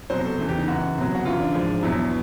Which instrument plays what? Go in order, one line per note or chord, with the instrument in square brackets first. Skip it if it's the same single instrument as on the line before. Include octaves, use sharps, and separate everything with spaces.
[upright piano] C2 B2 F#3 C5
A4
E2 C#3 E3
G4
D#4
F#2 C#3 E3 F#4
C2 B2 F#3
F#4
F#2 C#3 E3 F4
D4
G#2 F3
E2 B2 F#3 E4